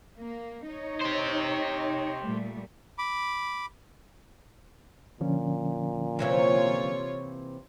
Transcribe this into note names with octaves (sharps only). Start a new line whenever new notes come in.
A#3
D#4 C#5
G4 C5
A#2 G3 A3
B5 D6
A#2 D3 F3 C#4
C3 E3 A#3 F4 C#5